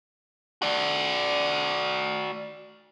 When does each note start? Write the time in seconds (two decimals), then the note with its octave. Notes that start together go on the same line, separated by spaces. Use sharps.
0.62 F#4 D5